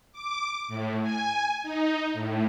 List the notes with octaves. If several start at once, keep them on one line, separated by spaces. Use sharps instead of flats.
D6
A2
G#5
D#4
A2